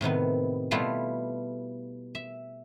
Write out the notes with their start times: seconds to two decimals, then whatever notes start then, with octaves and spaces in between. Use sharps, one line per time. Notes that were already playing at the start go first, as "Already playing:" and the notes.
0.01 A2 C3 D#3 B3
0.71 B2 G3 A3 B3 E4 F4
2.15 E5